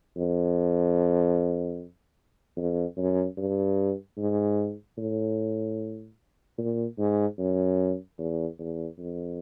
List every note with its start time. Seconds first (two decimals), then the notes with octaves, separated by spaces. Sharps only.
0.16 F2
2.57 F2
2.97 F#2
3.37 G2
4.17 G#2
4.98 A2
6.58 A#2
6.98 G#2
7.39 F#2
8.19 E2
8.59 E2
8.99 F2